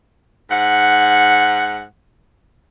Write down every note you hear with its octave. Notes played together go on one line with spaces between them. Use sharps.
G#2 F#5